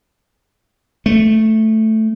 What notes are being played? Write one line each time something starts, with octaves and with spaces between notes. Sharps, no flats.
A3